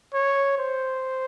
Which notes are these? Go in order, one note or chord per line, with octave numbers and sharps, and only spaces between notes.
C#5
C5